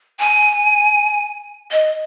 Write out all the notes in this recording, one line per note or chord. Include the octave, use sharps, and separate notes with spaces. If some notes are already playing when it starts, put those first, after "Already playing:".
G#5
D#5